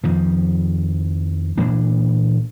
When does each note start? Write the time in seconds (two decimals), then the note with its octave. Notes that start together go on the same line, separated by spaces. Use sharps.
0.04 F2 D#3 F3
1.57 A#2 E3 A#3 D4